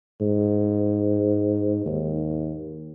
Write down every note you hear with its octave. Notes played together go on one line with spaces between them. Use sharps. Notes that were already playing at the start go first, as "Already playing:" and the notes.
G#2
D#2